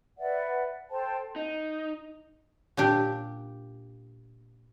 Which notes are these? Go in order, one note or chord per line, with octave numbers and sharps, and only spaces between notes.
B4 D5 E5 F#5
A4 C5 G5 A5
D#4
A#2 D4 G4